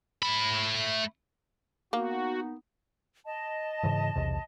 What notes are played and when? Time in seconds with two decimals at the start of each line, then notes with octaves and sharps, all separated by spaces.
0.23 A3 B5
1.93 A#3 B3 D#4 F#4
3.26 D#5 A5
3.83 G#2 C#3 E3
4.15 B1 E2 C3